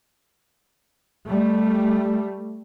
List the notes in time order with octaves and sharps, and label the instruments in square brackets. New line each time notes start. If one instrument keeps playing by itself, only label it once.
[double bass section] G3 A3